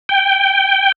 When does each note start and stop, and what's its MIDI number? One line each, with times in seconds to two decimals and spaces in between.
0.09 0.92 79